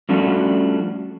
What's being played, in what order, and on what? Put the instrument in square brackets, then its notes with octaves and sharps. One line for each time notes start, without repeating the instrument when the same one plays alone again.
[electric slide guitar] F3 G3 A3 C#4 D4 F#4